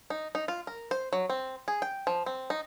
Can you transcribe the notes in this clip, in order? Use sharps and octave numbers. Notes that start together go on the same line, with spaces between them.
D#4
D#4
F4
A#4
C5
F#3
C4
G#4
G5
F3
C4
D#4